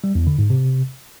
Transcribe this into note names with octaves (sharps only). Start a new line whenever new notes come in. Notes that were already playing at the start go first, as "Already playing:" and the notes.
G3
E2
D3
G#2
C3